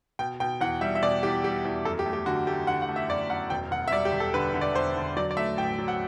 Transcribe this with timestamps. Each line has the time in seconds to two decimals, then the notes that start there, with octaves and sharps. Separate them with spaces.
0.19 B2 G5
0.40 B2 G5
0.61 E2 F#5
0.81 G3 E5
0.95 E5
1.03 B2 D5
1.23 E2 G4
1.44 G3 G4
1.65 E2
1.85 F#2 A4
1.99 G4
2.06 A3
2.13 G4
2.26 D3 F#4
2.47 A3 G4
2.67 D3 F#5
2.82 F#5
2.89 A3
2.96 E5
3.09 F#2 D5
3.29 F#2 F#5
3.50 E1 G5
3.71 E1 F#5
3.88 E5
3.92 G3 D5
4.05 G4
4.12 E1
4.20 A4
4.34 D3 B4
4.54 D3
4.61 D5
4.75 E1 C5
4.96 D3
5.17 F#3 D5
5.31 D5
5.37 A3 E5
5.57 A1 G5
5.78 F#3
5.88 F#5